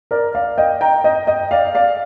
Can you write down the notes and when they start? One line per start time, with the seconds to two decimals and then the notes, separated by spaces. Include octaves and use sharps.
0.11 A#4 D5
0.35 D5 F5
0.58 D#5 G5
0.81 G5 A#5
1.04 D#5 G5
1.27 D#5 G5
1.51 D5 F5
1.75 D5 F5